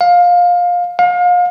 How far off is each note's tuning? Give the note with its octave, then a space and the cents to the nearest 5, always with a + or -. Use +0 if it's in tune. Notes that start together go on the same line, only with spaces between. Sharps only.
F5 +20
F5 +35